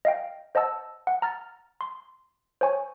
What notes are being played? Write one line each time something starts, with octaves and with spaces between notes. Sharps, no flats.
D#5 F5 G5
C5 D#5 F#5 A5 E6
F#5
A#5 F6 A6
C6
C5 C#5 G#5 C#6